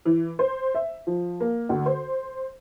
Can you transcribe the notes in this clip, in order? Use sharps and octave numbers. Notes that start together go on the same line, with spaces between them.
E3
C5
E5
F3
A#3
D2
C5